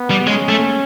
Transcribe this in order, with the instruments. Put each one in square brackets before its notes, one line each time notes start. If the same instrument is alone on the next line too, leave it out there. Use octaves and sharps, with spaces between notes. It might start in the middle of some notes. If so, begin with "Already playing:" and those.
Already playing: [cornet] B3
[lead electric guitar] G3
[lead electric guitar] G#3 [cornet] C#4
[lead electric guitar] A3